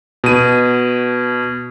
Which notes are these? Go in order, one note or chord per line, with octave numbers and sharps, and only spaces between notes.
B2 D#7